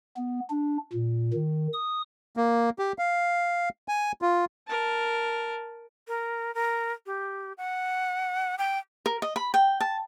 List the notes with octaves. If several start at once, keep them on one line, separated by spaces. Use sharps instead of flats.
B3
D4
A#2
D#3
D#6
A#3
G4
F5
G#5
F4
A#4 A5
A#4
A#4
G4
F#5
G5
A#4
D#5
B5
G5
A5